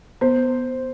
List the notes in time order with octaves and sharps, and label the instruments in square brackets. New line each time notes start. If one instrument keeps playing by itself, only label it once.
[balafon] B3 [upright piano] C5